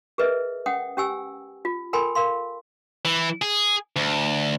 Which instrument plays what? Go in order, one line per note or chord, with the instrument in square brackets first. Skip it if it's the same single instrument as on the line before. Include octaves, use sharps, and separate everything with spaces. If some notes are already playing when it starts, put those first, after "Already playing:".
[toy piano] G#4 A#4 B4 D#5 E5
C#4 F#5 G5 D#6
C#4 G4 G5 G#5 E6
F4
A4 A#4 G5 G#5 B5 C6
A#4 F5 C6
[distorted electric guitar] E3
G#4
D2